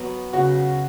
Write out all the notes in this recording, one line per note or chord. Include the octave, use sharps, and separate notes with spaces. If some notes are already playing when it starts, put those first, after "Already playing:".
Already playing: F#3 B3
C#3 F#4